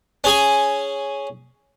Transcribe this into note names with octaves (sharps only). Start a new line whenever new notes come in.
C#4 G#4 G#5